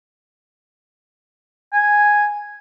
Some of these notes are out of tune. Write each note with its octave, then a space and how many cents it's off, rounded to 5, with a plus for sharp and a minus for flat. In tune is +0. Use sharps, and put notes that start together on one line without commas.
G#5 +0